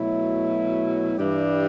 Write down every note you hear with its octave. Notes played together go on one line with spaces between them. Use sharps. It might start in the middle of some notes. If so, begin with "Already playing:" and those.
Already playing: B2 F#3 A3 E4
G2 E3 G3 D4 G4